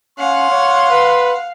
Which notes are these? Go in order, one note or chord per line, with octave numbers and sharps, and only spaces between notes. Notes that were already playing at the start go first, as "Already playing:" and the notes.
C#4 F5 F#5 C6
C#5
B4